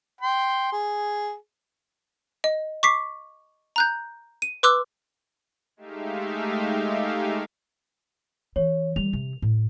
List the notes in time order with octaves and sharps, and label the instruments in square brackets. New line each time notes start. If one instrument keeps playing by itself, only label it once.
[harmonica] G5 C6
G#4
[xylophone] D#5
C#6 D6 B6 C7
A#5 F#6 G6
D#7
B4 C6 D6 E6 F#6
[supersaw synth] G#3 A3 D#4 G4 E5 F5
[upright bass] E3 [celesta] C#5
[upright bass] G3 A3 [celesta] F7
[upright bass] C3
A2